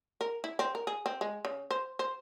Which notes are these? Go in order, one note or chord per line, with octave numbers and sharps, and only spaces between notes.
A#4
E4
C4
A#4
G#4
C4
G#3
C#3
C5
C5